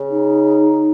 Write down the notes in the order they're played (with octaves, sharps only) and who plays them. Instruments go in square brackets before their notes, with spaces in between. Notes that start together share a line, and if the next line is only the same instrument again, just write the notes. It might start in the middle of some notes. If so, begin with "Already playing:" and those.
Already playing: [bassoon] C#3
[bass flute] D#4